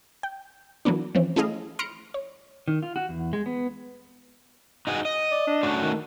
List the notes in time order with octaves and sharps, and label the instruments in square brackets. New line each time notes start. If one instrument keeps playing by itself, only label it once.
[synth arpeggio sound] G5
E3 F#3 A#3 B3 D4
E3 F3 C4 C#4
A3 C#4 E4 G#4 D#5 F5
B5 C6 F6 A#6 C#7 D7
C#5
[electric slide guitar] D#3
F4
F#4
E2
G#3
B3
D#4 F#4 G#4
D#5
[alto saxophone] D5
D4
[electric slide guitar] A3 C#4 F#4
[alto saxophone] D#3